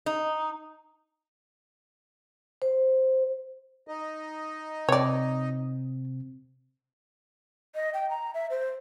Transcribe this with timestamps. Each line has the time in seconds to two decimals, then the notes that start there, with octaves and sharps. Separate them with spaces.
0.06 D#4
2.62 C5
3.88 D#4 D#5
4.89 C3 C4 C#5 D5
7.75 D#5
7.94 G5
8.10 A#5
8.34 E5
8.50 C5